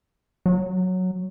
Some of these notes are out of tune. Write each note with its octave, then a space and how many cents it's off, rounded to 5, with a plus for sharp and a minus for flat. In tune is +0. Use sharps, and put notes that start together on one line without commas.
F#3 -5